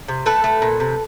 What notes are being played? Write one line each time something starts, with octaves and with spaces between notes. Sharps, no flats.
C3
A3 A4 B4
A3
A#2
C3